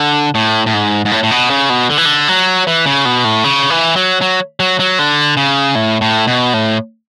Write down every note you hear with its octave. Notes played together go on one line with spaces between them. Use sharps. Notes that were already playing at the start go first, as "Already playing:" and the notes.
Already playing: D3
A2
A2
G#2
G#2
A2
A2
B2
C#3
B2
D3
E3
D3
F#3
E3
C#3
B2
A2
C#3
E3
F#3
F#3
F#3
F#3
D3
C#3
A2
A2
B2
A2